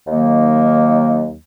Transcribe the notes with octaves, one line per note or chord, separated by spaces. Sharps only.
D#2 D#3 F#3 A#3 D#4